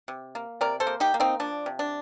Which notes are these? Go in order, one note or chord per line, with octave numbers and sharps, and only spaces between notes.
C3
A#3
C3 A#4 D5
A4 C5
A#3
D#4 G4
A#3
C4 D#4
F3 D4
C3
D4